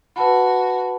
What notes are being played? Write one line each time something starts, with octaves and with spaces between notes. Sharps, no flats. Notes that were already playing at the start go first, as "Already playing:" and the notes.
F#4 B4 A5 B5